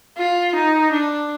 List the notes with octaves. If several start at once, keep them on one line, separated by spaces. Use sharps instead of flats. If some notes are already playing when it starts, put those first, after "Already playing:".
F4
D#4
D4